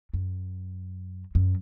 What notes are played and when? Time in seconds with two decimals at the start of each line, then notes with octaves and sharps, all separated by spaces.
0.14 F#2
1.35 F#2